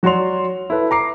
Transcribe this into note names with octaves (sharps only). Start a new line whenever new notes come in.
F#3 F#4 C#5 D5 C6 F7
E4 A4 B4
A#5 D6 C7